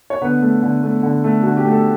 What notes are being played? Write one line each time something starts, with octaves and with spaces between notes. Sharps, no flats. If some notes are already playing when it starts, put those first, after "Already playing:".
C#5
D3 B3 B4
A3
D3
A3
D3
A3
D3 F#4
G4
A3
A4